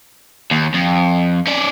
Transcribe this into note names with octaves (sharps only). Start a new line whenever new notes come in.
D#2
F2
C#4 D5